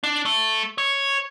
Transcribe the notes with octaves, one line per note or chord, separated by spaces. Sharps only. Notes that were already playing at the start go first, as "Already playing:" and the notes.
D4
A3
C#5